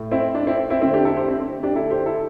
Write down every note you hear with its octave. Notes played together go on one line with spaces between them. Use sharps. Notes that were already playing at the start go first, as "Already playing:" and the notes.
Already playing: A2 A3
C4 E4
D4
C4 E4
C4 E4
D3 A3 C4 E4
D4 G4
E4 A4
G4 C5
C4
C4
D4 G4
D3 A3 E4 A4
G4 C5
E4 A4